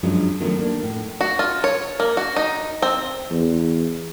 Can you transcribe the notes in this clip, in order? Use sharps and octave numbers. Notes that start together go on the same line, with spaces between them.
G2 F3 F#3 G#3 C#4
D#3 F3 F#3 A3 B3 C#4
A#3 D4
A2
F#4
F4
C#5
A#3
F#4
D#4
C4
E2